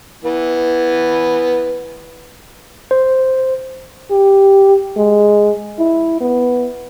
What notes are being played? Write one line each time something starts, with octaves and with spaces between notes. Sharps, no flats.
E3 B3
C5
G4
G#3
E4
B3